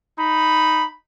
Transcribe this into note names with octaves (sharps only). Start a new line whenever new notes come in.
D#4 B5